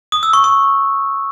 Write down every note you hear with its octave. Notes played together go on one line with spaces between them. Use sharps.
D#6
E6
C#6
C#6